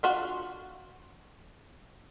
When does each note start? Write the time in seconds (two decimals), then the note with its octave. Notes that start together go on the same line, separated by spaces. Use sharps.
0.03 D4 F4 F#4